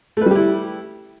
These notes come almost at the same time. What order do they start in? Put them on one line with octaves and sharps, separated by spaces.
A3 B4 G3 G4 E4